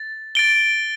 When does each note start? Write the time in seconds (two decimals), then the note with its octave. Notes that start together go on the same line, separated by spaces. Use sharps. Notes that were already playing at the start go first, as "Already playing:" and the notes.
Already playing: A6
0.35 A6 D7 G7